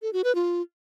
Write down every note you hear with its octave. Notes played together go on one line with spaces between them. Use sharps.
A4
F#4
B4
F4